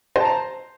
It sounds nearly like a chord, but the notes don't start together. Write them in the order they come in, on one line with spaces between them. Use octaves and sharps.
C5 A5 A#5